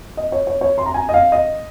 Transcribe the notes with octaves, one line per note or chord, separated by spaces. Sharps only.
D#5
C#5
C#5
C#5
C6
A#5
G#5
D#5
F5
D#5